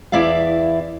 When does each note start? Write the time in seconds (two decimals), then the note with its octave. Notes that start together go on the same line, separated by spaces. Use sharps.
0.12 E2 E4 D5 E5 F5